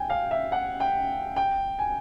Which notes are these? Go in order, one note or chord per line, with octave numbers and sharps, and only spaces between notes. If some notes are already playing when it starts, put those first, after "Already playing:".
Already playing: G5 G#5
F5
E5
F#5
G5
G5
G#5